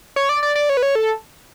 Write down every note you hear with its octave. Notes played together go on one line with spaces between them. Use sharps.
C#5
D5
D5
D5
C#5
B4
C#5
A4